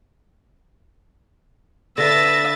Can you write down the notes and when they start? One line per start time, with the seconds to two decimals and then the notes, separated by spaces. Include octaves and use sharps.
1.98 D3 B4 E5 A6 A#6